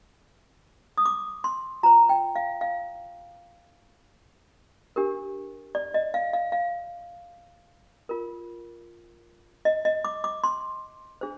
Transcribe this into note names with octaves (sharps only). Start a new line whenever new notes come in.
D#6
D6
C6
F4 C5 A#5
G5
F5
F5
D4 G4 A#4
D5
D#5
F5
F5
F5
F4 A#4
D#5
D#5
D6
D6
C6
D4 G#4 C5